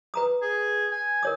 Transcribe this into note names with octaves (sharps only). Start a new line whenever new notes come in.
B4 A#5 D#6
G#4
G#5
A#4 C#5 D#6